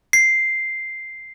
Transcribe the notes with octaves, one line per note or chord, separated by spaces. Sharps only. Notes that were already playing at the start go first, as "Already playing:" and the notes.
C7